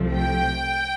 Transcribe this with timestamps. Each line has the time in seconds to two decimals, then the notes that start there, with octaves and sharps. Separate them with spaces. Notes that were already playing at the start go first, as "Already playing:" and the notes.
Already playing: C2 C3 F3 A3
0.13 G5